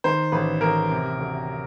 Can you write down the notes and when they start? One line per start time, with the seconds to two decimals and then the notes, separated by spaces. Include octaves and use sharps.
0.04 D#3 C5
0.32 A1 B4
0.61 A1 A#4
0.91 C3
1.19 D2